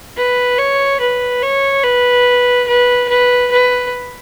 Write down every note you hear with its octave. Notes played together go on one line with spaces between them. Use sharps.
B4
C#5
B4
C#5
B4
B4
B4
B4